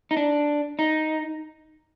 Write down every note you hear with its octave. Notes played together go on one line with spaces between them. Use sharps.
D#4
D4
D#4